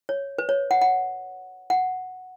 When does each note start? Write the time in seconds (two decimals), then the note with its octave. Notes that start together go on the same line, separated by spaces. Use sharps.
0.09 C#5
0.38 B4
0.49 C#5
0.71 F#5
0.81 F#5
1.70 F#5